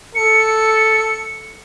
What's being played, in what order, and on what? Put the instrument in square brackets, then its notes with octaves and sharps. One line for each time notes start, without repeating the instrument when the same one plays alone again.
[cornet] A4 [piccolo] C#7